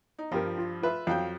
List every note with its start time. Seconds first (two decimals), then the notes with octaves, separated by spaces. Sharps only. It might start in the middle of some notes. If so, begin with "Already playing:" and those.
0.19 D#4
0.32 G2 F3 F4 G4 A#4
0.58 F4
0.82 F4 B4 E5
1.07 F2 F#3 F5 G5 G6